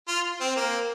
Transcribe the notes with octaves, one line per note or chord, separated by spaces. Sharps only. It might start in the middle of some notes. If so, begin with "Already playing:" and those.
F4
C4
A#3